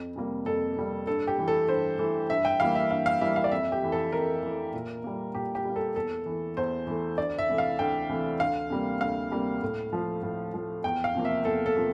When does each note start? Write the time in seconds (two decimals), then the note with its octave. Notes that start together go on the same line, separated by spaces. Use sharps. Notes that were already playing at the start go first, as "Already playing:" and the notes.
Already playing: F2
0.16 C3 G3 A#3
0.46 F2 A4
0.77 C3 G3 A#3
1.07 G2 A4
1.27 G4
1.38 E3 A3
1.48 A4
1.68 G2 C5
1.99 E3 A3
2.30 G2 E5
2.45 G5
2.60 E3 G3 A#3 F5
2.75 E5
2.90 G2 F5
3.06 F5
3.21 E3 G3 A#3 E5
3.36 F5
3.44 D5
3.52 F2 E5
3.72 G4
3.82 E3 A3
3.92 A4
4.12 F2 A#4
4.43 E3 A3
4.73 A#2
5.04 G3 A#3
5.35 A#2 G4
5.55 G4
5.65 G3 A#3
5.76 A4
5.96 E2 A4
6.26 E3 A3
6.57 E2 C5
6.87 E3 A3
7.18 D2 D5
7.39 E5
7.48 C3 E3 A3
7.58 F5
7.79 D2 G5
8.09 C3 E3 A3
8.40 D2 F5
8.70 C3 G3 A#3
9.01 D2 F5
9.31 C3 G3 A#3
9.62 A2
9.93 F3 A3
10.23 A2
10.54 F3 A3
10.84 E2 G5
11.04 F5
11.15 C3 F3 A#3
11.25 E5
11.45 E2 A4
11.66 A4
11.76 C3 F3 A#3